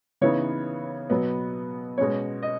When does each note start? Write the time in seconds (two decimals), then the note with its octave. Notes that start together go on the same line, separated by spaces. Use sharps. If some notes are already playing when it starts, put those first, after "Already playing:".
0.21 C#3 E3 B3 D#4 C#5
1.10 B2 F#3 B3
1.98 B2 G#3 C#4 C#5
2.42 D#5